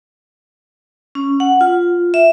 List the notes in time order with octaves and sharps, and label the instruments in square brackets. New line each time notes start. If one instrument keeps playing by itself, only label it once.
[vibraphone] C#4
F#5
F4
E5